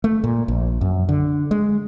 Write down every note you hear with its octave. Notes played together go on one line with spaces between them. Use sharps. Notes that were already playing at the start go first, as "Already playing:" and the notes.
A3
A#2
A#1
F#2
D3
G#3